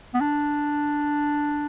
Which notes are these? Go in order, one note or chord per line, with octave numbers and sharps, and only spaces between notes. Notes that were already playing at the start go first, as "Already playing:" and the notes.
B3
D4